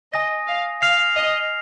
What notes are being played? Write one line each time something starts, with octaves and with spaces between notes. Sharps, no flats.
D#5 G#5 D#6 A#6
F5
F5 F6 C7 F7
D#5